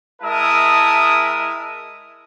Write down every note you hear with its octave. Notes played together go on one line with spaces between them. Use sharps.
G#3 E4 A#4 E5 A5 D#6